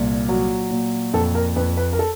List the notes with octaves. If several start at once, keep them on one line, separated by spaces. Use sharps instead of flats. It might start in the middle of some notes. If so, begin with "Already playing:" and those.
Already playing: C2 A#2
F#3
A#2
F2 A4
A#4
F2 B4
B4
A#4
A4